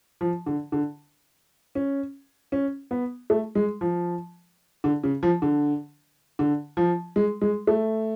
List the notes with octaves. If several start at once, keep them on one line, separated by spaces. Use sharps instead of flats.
F3
D3
D3
C#4
C#4
B3
A3
G#3
F3
D3
C#3
F3
D3
D3
F3
G#3
G#3
A3